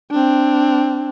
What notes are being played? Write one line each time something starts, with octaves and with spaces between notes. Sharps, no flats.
C4 D4